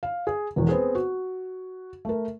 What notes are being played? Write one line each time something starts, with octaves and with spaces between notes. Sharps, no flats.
F5
G#4
E1 E2
B3 C4 G#4
F#4
A3 A#4